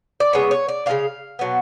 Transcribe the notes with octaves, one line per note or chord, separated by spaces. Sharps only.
D5
C#3 G#3 B3 C#5
C#5
D5
C#3 G#3 B3 D4 F5
B2 F#3 B3